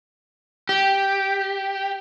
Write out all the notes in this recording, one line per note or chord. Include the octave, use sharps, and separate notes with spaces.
G4